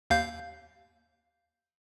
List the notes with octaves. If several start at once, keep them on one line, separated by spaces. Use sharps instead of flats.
D#2 F5 G6